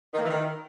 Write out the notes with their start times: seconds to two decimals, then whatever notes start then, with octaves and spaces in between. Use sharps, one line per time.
0.13 D#3
0.19 A#3
0.24 E3
0.29 D#3